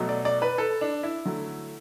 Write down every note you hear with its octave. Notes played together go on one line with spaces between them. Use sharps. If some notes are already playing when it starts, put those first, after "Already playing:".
Already playing: B2 F#3 A3
D5
D5
B4
A4
D4
E4
D3 F#3 A3